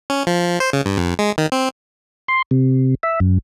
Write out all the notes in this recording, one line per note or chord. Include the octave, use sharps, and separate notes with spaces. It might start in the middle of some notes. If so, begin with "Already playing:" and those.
C#4
F3
C5
C#3
G2
F2
G#3
D#3
C4
C6
C3
E5
F#2